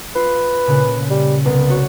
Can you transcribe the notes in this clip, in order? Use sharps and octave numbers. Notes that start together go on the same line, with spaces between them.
F4 B4
A#2 C#3 F#6
G3
C2 B3
F#4 C#5